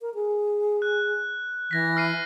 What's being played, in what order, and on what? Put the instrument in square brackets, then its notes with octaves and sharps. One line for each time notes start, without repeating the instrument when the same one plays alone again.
[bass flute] A#4
G#4
[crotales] F#6
[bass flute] E3 [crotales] G#6 A#6 B6
[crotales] F6 C7 D#7